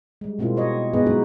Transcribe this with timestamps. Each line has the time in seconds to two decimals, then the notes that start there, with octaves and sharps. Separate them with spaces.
0.21 G3 G#3
0.39 B2 G#3 A#3 C4 E4 F4
0.57 F#4 C#5 D#5
0.93 G#3 B3 D#4 G#4 B4 D#5
1.06 F#3 G#3 C#4 D#4 E4 F#4